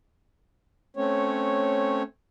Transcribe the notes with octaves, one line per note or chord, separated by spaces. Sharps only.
A3 C4 C#4 C#5